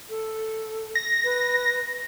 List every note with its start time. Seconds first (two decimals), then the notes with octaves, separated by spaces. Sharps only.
0.10 A4
0.95 A#6
1.24 B4